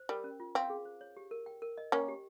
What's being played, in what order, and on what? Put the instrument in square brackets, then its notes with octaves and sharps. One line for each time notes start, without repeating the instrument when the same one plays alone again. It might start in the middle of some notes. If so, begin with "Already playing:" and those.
Already playing: [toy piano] C5
[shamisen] G3 [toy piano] A#4
[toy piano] C#4
F4
[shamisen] C4 [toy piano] F5
[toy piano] G#4
C5
C#5
G4
A#4
G5
A#4
D#5
[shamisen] A#3 C#4 [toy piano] G5
[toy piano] G4